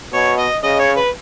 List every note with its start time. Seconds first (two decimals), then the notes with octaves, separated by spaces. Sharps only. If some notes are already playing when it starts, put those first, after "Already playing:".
0.13 B2 C#5
0.38 D#5
0.64 C#3 D#5
0.80 C#5
0.97 B4